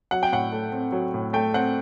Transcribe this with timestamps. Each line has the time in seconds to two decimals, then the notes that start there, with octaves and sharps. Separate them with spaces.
0.11 F#3 F#5
0.23 G5
0.32 A2 F#5
0.52 A3
0.72 C4
0.92 F#3
1.14 A2
1.33 A3 G5
1.54 C4 F#5